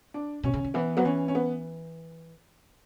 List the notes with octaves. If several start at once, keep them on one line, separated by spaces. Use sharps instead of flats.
D4
B2 C#4
C#3
D3
E3 B3
F#3 B3
E3 C#4
C#4
B3